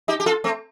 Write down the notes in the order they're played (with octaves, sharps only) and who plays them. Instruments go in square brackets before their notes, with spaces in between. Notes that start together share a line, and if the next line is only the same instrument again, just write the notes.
[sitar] D#4 G4
G4
F4 A4
A3 C4